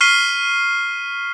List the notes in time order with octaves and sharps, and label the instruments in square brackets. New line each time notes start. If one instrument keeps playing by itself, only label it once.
[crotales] C#6 F6 B6 C7 D#7 G7